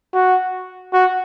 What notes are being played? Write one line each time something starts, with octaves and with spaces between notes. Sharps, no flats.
F#4
F#4